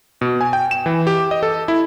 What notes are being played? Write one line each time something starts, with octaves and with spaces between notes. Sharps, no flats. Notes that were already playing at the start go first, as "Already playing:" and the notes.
B2
G#5
G5
E7
E3
G4
D#5
A4
E4